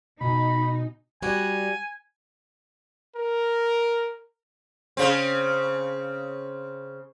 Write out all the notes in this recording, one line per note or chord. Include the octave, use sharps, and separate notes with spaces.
B2 D#4 G#5 B5
G3 F#4 G#5
A#4
C#3 C4